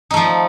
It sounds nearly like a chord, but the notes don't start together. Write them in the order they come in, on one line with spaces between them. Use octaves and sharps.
D#4 A3 F3